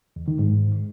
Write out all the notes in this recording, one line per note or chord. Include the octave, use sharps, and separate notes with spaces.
E2
D#3
G#2